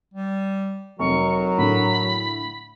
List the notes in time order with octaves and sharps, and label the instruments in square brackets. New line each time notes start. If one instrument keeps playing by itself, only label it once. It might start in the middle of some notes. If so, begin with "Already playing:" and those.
[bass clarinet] G3
[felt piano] F1 [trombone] F#3 [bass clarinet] A#4 [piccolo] C#6
[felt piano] A2 D3 [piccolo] B5